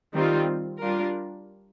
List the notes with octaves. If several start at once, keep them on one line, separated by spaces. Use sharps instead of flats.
D#3 G3 C4 F4
G3 D4 F4 A#4